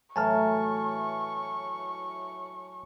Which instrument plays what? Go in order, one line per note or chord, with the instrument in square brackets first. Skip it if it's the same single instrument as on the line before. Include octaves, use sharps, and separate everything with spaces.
[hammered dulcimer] A2 E3 F#3 [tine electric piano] G#5 A5 F6 [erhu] C#6